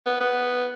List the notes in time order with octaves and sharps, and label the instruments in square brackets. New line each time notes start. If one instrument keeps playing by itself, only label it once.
[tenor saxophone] B3
B3